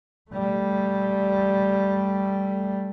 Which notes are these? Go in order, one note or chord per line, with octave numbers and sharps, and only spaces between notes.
G3 A3